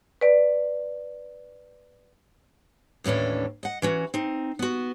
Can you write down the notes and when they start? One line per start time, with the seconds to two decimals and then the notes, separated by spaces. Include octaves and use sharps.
0.21 B4 D5
3.04 D#2 A2 E3 C#4 D4
3.63 D#5 F#5
3.82 E3 C#4 F#4
4.14 C4 D#4
4.59 B3 F#4